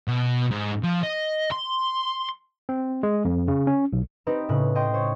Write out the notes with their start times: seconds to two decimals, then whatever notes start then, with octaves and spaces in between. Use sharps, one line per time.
0.08 B2
0.51 G#2
0.84 F3
1.03 D#5
1.52 C6
2.69 C4
3.03 G#3
3.25 F2
3.48 C#3
3.67 C#4
3.93 B1
4.27 C4 D#4 G4 B4
4.49 A2 C#3 F#6
4.75 D#5 G5 C6
4.94 C5 C#5